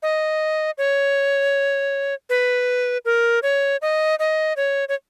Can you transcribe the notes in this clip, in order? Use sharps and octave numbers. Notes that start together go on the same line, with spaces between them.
D#5
C#5
B4
A#4
C#5
D#5
D#5
C#5
C#5